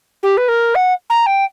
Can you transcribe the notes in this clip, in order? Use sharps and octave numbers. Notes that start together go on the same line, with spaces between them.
G4
B4
A#4
F#5
A#5
G5